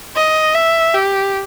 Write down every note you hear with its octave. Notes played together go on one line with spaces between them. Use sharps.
D#5
E5
G4